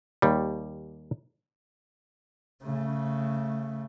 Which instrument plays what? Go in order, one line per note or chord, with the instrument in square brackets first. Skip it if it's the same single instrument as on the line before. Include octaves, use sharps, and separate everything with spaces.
[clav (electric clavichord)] D#2 G3
[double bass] C#3 A3